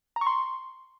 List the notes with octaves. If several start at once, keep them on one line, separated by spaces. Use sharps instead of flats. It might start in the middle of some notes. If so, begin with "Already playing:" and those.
A#5
C#6
C6